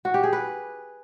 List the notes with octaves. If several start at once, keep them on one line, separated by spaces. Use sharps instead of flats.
F#4
G4
G#4
B4